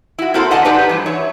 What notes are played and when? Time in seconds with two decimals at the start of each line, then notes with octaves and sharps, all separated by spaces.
0.19 E4 F#4
0.34 A#3 C4 E4 F#4 A4 C5
0.51 D3 D4 D#5 F#5 G#5 A5
0.65 D4 D#4 F#4 G4 B4 C5
0.89 G2 E3
1.06 C#5 E5